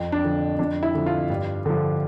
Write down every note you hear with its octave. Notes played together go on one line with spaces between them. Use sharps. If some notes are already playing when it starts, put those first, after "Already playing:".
Already playing: F2
D4
D3 F3
F2 D4
E4
D3 F3
F4
G2
D3 F3